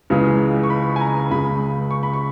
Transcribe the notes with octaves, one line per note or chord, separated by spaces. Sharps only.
C#2 C#3 E3 G#3
C#6
B5
G#5
A#5
C#2 C#3 G#3 B5
C#6
B5
C#6